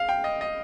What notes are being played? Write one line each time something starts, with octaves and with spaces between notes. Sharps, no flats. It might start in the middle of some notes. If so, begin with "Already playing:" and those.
Already playing: F5
G5
D#5
D#5